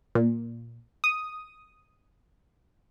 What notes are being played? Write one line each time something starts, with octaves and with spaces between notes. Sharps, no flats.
A#2
D#6